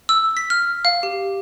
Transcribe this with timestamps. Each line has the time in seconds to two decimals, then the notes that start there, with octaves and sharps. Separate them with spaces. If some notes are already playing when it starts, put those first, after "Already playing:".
0.09 E6
0.37 B6
0.50 F6
0.85 F5
1.03 G4